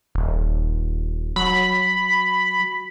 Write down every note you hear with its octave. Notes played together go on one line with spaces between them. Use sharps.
D#1
F#3 B5